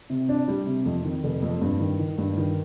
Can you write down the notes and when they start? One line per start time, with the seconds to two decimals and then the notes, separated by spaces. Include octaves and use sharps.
0.10 C3
0.29 D4
0.48 G3
0.67 C3
0.86 F2
1.04 D#3
1.24 F1
1.42 F2
1.61 G2
1.80 D#3
1.99 D#3
2.18 G2
2.38 D#3